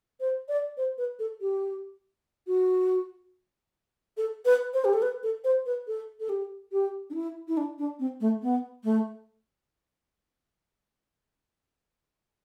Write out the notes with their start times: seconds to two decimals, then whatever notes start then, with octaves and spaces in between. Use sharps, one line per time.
0.20 C5
0.49 D5
0.77 C5
0.98 B4
1.19 A4
1.41 G4
2.47 F#4
4.17 A4
4.45 B4
4.74 C5
4.85 G4
4.93 A4
5.02 B4
5.23 A4
5.44 C5
5.66 B4
5.87 A4
6.20 A4
6.29 G4
6.72 G4
7.10 D4
7.15 E4
7.48 E4
7.57 D4
7.79 D4
7.99 C4
8.21 A3
8.42 B3
8.84 A3